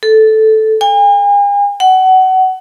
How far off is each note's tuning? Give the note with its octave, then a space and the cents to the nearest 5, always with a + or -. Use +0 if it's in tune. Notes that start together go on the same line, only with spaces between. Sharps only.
A4 -10
G#5 -45
F#5 +25